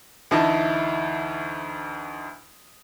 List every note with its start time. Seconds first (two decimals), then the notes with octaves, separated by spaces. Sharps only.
0.31 D2 E3 D#4 E4 A5